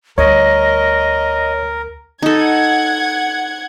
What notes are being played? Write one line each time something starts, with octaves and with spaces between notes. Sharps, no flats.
D2 G3 A#4 C#5 D#5
D#4 A4 F#5 G#6